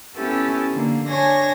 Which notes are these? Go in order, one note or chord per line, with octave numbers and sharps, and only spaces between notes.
B3 C#4 E4 G4 A4
D3 A#3
D4 C#5 G#5 A#6